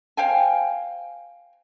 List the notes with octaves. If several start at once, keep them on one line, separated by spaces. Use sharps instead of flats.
C5 F5 G5 G#5